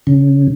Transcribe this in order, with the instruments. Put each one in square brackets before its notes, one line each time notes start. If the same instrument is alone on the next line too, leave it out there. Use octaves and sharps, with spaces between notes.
[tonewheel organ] C#3